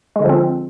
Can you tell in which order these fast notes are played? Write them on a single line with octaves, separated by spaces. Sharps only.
G#3 D3 F3 C4